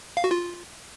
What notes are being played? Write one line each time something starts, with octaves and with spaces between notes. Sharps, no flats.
F5
F#4
F4